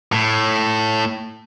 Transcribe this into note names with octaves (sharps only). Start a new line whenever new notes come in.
A2